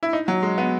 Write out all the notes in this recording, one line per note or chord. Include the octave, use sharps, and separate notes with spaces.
E4
D#4
F#3
G#3
B3